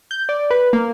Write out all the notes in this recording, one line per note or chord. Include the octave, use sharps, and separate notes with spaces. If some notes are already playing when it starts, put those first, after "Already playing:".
G6
D5
B4
A#3